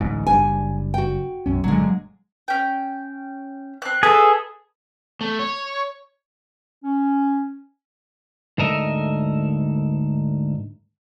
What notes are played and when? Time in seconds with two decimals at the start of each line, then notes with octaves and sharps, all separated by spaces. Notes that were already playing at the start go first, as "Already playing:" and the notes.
0.01 A1 D2 G#2
0.27 F#1 G3 D4 G#5
0.94 F#4 G5
1.46 B1 F#2 C#4
1.64 G1 A#2 D3 F#3 G#3
2.48 C#4 G5
3.82 C4 F#6
4.03 G#4 A4 B4 E5
5.21 A3
5.39 C#5
6.84 C#4
8.58 D2 G#2 A4 A#4 D#5 E5